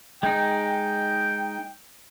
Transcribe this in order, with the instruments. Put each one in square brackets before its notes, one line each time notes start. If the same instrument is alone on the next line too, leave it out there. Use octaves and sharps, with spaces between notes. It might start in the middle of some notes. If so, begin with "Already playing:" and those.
[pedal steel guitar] G#3 D#4 [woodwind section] G5